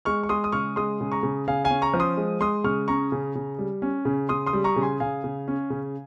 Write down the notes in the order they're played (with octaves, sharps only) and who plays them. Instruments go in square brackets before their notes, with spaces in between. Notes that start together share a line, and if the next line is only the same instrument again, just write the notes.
[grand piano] G#3 C#6 F6
C#6
G#3 C6 D#6
D#6
C#3 C#6 F6
G#3 C6 D#6
C#3
A#5 C#6
C#3
C#3 F5 G#5
F5 G#5
C#4
A#5 C#6
F3
C6 D#6
G#3
G#3 C6 D#6
C#3 C#6 F6
C#4 A#5 C#6
C#3
C#3
G3
C#4
C#3
C#3 C6 D#6
C6 D#6
G3
A#5 C#6
C#3
G#5 C6
C#3 F5 G#5
C#3
C#4
C#3